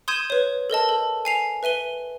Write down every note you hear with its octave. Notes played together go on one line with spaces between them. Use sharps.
C6 D#6 G6 G#6 D#7 E7
B4 C#5
A4 A#4 D#5 A5
A4
G#5 C7 F7
B4 E5 D#7 G7